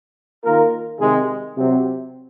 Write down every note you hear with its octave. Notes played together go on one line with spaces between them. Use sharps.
D#3 A#3 F4 A#4
C3 D#3 G#3
C3 F#3 C4